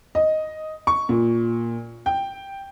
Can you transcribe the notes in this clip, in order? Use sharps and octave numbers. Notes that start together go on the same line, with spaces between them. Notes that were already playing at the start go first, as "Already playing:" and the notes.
D#5
C#6
A#2
G5